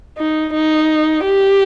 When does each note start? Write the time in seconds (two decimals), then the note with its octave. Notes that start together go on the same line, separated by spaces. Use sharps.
0.17 D#4
0.54 D#4
1.26 G4